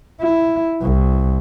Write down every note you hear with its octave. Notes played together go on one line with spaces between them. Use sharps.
E4
C2